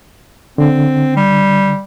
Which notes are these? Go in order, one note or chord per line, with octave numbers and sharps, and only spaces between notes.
D3 C4
G3